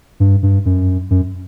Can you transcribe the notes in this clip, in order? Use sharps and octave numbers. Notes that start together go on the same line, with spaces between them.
G2
G2
F#2
F#2